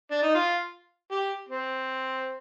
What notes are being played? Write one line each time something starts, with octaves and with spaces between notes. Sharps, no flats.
D4
D#4
F4
G4
C4